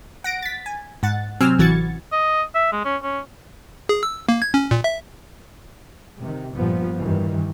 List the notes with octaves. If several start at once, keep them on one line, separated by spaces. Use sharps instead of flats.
F#5 A#6 D7
A6 B6
G#5
G#2 F#5 A6
C3 F#3 C4 G#5 E6 F6
A1 E3 F#4 G#6 A6 C#7
D#5
E5
G#3
C#4
C#4
G#4
E6
A#3
G#6
C#4
A#2
E5
C3 D#3
G2 A#2 F3 G3 B3
G2 D#3 E3